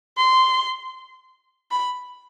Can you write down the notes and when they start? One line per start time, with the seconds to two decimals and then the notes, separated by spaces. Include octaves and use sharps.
0.17 C6
1.71 B5